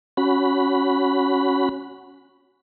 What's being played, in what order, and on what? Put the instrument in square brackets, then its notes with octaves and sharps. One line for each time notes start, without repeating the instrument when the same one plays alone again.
[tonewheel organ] C#4 F#4 B5